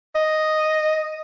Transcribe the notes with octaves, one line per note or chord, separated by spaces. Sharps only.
D#5